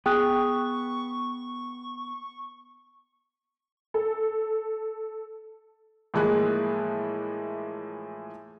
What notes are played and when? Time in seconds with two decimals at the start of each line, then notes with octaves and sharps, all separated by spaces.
0.06 B3 G#4 G5 C#6 D#6 F#6
3.94 A4
6.14 A2 E3 F3 G#3 A#3 F#6